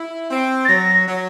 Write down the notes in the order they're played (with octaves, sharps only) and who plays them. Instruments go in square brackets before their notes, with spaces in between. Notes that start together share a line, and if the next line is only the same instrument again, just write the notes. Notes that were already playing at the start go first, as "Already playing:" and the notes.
Already playing: [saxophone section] E4
C4
[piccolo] A6
[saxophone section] F#3 [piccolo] A#6
[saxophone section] F#3